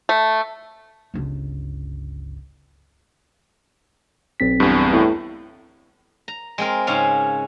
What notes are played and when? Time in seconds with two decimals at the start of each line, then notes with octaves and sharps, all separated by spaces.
0.09 A3
1.14 G1 C#2
4.40 B1 C4 B6
4.60 E2 G2
4.93 A2
6.28 A#5
6.58 G#3 C4 A#4
6.87 G#2 C#3 C#4 F5